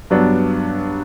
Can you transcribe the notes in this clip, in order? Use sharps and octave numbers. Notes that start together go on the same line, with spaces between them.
G2 F#3 B3 D4